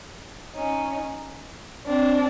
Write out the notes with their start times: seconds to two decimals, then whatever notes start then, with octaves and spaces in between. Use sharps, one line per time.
0.55 C#4 D#4
1.86 C4 D4